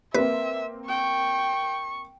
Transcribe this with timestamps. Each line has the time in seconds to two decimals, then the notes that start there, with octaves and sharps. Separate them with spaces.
0.14 A#3 C4 B4 E5
0.89 G5 C#6